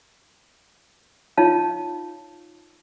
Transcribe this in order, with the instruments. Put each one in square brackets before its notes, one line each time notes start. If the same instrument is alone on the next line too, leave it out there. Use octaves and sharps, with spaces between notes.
[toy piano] D#4 F4 C#5 F5 A5